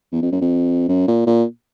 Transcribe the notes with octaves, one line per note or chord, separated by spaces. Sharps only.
E2
F2
F#2
F2
F#2
A#2
A#2